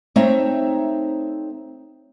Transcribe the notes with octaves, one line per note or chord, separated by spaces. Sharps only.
A3 C4 D#4 C#5 E5 A#5